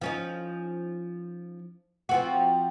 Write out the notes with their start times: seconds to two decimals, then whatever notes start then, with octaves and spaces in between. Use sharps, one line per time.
0.01 F3 C#4 D#4
2.09 F3 C4 F#4